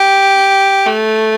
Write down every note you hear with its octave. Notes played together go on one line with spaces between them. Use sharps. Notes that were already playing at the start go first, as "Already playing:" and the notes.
Already playing: G4
A3